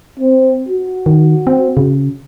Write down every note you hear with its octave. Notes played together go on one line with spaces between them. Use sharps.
C4
F#4
D#3
C4
C#3